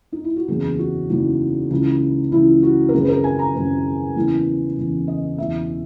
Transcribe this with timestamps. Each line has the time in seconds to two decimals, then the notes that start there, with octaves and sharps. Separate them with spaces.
0.12 D#4
0.24 E4
0.36 F#4
0.48 F#1 E2 C#3 E3 G#4
0.79 F#4
1.09 F#1 E2 C#3 E3 D#4
1.71 C#2 C#3 E3
2.32 C#2 C#3 E3 E4
2.63 F#4
2.89 A#4
2.94 G#1 F#2 C#3 G#4
3.03 B4
3.08 A#4
3.24 G#5
3.39 A#5
3.54 G#1 F#2 C#3 B4
4.16 F#1 E2 C#3 E3
4.77 F#1 E2 C#3 E3
5.08 D#5
5.38 E1 E2 C#3 E3 E5